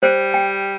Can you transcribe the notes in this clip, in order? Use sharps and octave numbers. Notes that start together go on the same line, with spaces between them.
G3 C5
G5